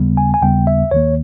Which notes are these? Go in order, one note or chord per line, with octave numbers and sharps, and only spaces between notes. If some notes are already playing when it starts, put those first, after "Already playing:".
Already playing: D#2 C#3 G3 B3
G#5
G#5
D#2 C#3 G3 B3 G5
E5
D#2 D#3 A#3 C#5